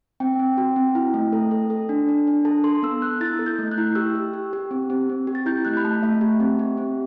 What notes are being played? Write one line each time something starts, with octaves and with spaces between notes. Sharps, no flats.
C4 G5
C4
F#4
C4
E4
A3
A4
A4
A4
D4
D4
D4
A4 A5
A4 C6
B3 E6
B3 F#6
E4 A6
A4
G6
A3
F#6
E4
G4 E6
G4
G4
G4
C4
C4
C4
G4
A6
E4 G6
A3 F#6
B5
A3 A5
A3 E5
G4
C4
G4
C4